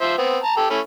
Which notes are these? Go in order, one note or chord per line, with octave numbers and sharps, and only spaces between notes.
F3 C5 E5
B3 C4
A5 A#5
G4 A4
A3 C#4 E4